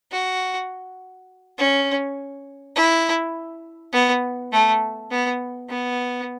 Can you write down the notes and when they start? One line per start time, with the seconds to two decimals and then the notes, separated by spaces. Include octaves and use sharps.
0.12 F#4
1.58 C#4
2.76 E4
3.93 B3
4.52 A3
5.10 B3
5.69 B3